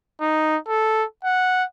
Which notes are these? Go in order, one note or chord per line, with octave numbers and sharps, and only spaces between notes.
D#4
A4
F#5